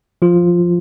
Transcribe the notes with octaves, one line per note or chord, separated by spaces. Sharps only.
F3 F4